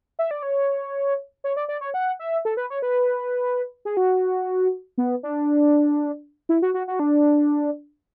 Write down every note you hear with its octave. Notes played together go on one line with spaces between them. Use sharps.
E5
D5
C#5
C#5
D5
D5
C#5
F#5
E5
A4
B4
C#5
B4
G#4
F#4
B3
D4
E4
F#4
F#4
F#4
D4